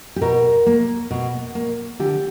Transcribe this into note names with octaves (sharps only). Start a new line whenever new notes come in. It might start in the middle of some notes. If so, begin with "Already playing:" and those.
G4
B2 A#4
A#3
B2
A#3
D3 G4